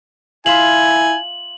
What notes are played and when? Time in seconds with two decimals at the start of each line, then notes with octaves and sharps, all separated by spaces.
0.46 E4 F4 E5 F5 G#5 F#7